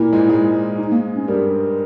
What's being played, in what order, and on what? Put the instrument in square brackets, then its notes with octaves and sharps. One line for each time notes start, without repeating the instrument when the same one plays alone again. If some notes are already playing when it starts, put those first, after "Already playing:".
Already playing: [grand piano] A#2 A#3 [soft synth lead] E4
[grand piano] G#2 G#3
G#2 G#3
[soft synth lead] D#4
A#3
C#4
[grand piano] G2 G3 [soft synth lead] A#4